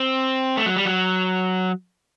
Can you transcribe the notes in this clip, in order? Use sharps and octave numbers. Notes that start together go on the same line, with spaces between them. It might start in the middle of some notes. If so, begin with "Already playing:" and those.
Already playing: C4
A3
F#3
G3
F#3